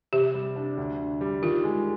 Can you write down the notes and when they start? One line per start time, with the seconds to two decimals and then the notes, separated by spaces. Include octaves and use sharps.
0.13 C3 G4
0.34 G3
0.56 D4
0.77 D2
0.99 D3
1.21 G3
1.42 D#3 F4
1.64 G#3